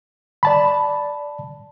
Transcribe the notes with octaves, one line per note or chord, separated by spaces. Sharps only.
D5 A5 B5